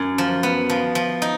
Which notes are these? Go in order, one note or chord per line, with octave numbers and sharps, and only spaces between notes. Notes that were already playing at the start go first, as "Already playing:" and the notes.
Already playing: F#2
F3
B3
F3
F3
D#4